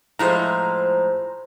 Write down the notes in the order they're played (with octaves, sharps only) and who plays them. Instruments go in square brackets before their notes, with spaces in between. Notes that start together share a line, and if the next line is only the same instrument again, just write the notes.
[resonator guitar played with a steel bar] A2 F3 G#3 [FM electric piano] C5 A#5